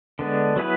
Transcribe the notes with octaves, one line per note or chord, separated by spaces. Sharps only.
D3 G#3 B3 D4
F#3 B3 E4 G#4 B4